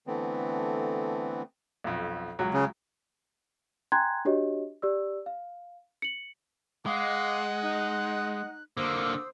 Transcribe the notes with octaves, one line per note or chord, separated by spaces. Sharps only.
D3 E3 A3 B3 C4
B1 F2
C#2 F#3
C#3
G5 G#5 A#5 C6 F#6 G#6
D4 F#4 G4 C#5 D#5
G4 D5 E6
F5
C#7 F#7
G#3 D#5 F5 F#5 D6
D#4 F#6
D3 A#3 C5 D#6 E6